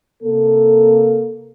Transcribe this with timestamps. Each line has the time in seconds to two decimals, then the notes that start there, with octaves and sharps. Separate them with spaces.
0.23 C3 A#3 A4